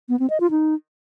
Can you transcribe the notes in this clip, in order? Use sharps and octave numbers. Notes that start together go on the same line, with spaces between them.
B3
C4
D#5
F4
D#4